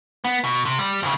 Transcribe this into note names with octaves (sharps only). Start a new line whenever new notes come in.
B3
B2
C3
G3
F2 C#3